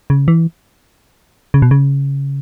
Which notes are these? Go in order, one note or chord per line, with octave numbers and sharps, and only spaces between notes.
C#3
E3
C#3
B2
C#3